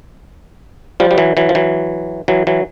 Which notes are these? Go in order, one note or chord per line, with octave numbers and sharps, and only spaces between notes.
F3 G3
G3
E3 F#3
E3 F#3
F3
E3 F#3
E3 F#3
E3 F#3